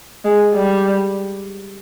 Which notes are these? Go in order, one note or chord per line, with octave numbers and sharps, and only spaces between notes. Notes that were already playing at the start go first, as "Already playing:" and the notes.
G#3
G3